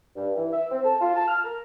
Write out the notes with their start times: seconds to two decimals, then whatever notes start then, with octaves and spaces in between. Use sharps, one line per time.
0.16 G2
0.36 E3
0.52 E5
0.71 C4
0.85 A5
1.01 F4
1.16 A5
1.28 F6
1.44 A#4